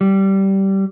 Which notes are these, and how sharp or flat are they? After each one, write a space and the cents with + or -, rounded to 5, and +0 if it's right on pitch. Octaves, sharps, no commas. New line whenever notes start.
G3 -15